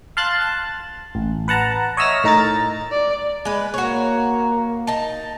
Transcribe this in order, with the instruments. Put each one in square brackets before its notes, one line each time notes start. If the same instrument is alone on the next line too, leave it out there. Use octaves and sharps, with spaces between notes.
[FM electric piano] F5 A5 C6 F#6 A6
A5
A1
B4 F#5 A5 A#5
C#5 D#5 E5 E6 F6 A#6
A2 D#4 A#4 A#5 A6
[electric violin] D5
[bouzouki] G#3 B4
[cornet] A#3 [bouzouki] F#4 C#5
[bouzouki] D#4 A5